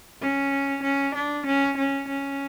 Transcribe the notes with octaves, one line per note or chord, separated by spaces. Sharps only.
C#4
C#4
D4
C#4
C#4
C#4